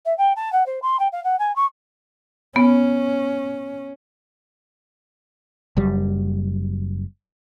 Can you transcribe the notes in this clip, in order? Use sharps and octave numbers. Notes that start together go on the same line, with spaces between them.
E5
G5
A5
F#5
C5
C6
G5
F5
F#5
G#5
C#6
B3 C#4
F#1 F#2 G3